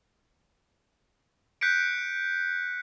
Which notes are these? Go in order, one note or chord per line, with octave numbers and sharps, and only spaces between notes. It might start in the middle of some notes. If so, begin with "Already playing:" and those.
F#6 G6 B6 C#7 D7